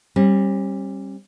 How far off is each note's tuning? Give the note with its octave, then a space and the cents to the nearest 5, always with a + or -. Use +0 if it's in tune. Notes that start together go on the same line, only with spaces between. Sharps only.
G3 +0 C#4 -45